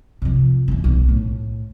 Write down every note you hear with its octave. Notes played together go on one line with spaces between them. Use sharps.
C3 F3
E3 G3
B1
A2